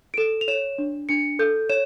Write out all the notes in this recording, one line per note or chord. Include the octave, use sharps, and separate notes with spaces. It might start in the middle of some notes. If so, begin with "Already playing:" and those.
D7
A4 E7
F7
C#5 E7
D4
D4 C#7
A4 G6
C#5 E7